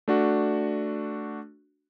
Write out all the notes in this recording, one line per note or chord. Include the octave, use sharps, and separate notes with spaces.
A3 D4 F#4